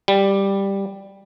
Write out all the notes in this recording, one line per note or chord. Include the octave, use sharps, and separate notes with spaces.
G3